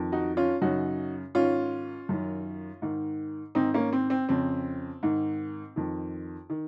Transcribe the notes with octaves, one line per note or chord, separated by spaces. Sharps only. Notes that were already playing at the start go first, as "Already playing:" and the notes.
Already playing: F2 D#3
D#4 F#4
C#4 F4
F#2 C#3 D#4 F#4
G#2 D#3 C#4 F4
F#2 D#3
G#2 D#3
G#2 D#3 C4 D#4
A#3 C#4
C4
C4
F2 C#3 C4
G#2 D#3
F2 D#3
D#3